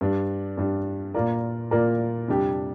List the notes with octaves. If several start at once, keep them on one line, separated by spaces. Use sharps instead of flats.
G2 G3 D4
G2 G3 D4
A#2 A#3 F4 A#4 D5
A#2 A#3 F4 A#4 D5
F2 C3 G3 D4 G4